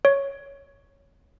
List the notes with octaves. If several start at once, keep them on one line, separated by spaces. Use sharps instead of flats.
C#5